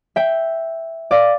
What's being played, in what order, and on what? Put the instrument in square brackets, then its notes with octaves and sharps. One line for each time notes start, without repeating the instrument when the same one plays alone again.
[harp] E5 G5
D5 F5